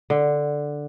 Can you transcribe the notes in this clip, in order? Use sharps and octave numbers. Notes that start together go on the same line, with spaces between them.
D3